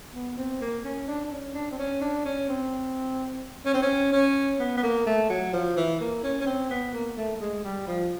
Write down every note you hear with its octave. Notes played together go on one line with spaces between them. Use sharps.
B3
C4
A#3
C#4
D4
D4
C#4
D4
C4
C#4
D4
C#4
C4
C#4
C4
C#4
C#4
B3
B3
A#3
A3
F#3
F3
E3
A#3
C#4
C#4
C4
B3
A#3
A3
A3
G#3
G3
F3